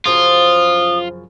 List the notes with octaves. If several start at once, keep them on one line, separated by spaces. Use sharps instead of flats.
F#2 C#3 F3 F4 D#6